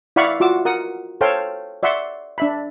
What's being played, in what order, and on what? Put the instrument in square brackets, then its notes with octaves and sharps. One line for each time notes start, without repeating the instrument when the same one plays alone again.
[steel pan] E4 D5 F5 F#5 B5 C#6
F4 F#4 D6 E6
A#4 F#5 D#6
A4 C5 C#5 F5 G5
D5 E5 F#5 C6 C#6
D4 E5 B5